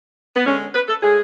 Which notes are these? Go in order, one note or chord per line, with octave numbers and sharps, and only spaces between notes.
B3
D3 G#3 C#4
B4
A4
A2 G#3 G#4